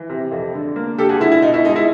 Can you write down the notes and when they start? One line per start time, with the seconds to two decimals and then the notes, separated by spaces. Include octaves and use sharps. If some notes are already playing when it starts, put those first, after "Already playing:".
Already playing: E3
0.09 C3
0.31 F2
0.54 D3
0.76 A#3
0.98 D3 G4 A4
1.09 F#4 G#4
1.20 D3 E4
1.32 E4
1.42 B2 D#4
1.54 E4
1.65 G#3 D#4
1.76 E4